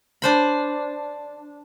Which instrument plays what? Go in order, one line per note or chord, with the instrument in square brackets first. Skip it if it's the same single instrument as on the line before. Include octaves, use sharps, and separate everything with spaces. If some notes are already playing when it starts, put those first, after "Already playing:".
[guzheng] D4 C5 B5